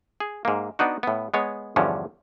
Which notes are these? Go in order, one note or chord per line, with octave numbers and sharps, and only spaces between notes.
G#4
G#2 A#3
B3 D4 D#4 F#4
A2 B3
G#3 B3 C#5
E2 G2 D3 F3 C#4